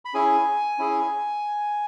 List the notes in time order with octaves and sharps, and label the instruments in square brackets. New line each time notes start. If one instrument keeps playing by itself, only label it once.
[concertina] B5
C#4 E4 G#4 G#5
C#4 E4 G#4